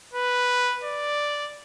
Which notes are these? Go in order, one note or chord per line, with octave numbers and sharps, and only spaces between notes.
B4
D5